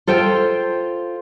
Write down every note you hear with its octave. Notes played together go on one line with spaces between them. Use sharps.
F4 A4 C5 G5